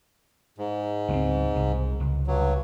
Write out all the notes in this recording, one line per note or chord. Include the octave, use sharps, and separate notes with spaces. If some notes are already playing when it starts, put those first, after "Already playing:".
G#2
C#2 A3 C4
C2
C#2
G2 F#3